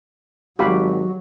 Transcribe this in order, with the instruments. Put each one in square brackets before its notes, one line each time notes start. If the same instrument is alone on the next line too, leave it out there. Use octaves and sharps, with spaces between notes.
[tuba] G#1 [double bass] F#3 [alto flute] F#4 [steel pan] G4 F5 B5